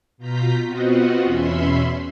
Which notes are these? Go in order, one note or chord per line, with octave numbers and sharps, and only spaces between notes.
B2 F4 A#5 G6 B6
B3 C4 F4 F#4 D#5 F#5
E2 B2 C#4 E5 B5 C6